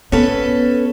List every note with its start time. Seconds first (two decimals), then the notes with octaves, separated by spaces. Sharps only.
0.12 B3 C#4 A4 B4